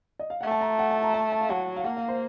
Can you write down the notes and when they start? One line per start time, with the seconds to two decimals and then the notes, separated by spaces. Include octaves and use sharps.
0.19 D#5
0.30 F5
0.41 A3 F#5
0.51 A5
0.61 A#5
0.79 F#5
0.91 A5
1.03 A#5
1.14 A5
1.32 A5
1.41 F5
1.49 F#3 F#5
1.76 F5
1.84 A#3 F#5
1.97 F5
2.08 C5